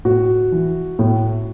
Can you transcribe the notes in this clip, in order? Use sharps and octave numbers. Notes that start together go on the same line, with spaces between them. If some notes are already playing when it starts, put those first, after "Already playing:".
A2 F#4
E3
A2